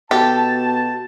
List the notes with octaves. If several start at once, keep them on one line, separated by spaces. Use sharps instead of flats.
B2 G4 A4 A5